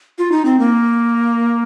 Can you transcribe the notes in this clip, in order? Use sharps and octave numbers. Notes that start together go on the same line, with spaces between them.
F4
D#4
C4
A#3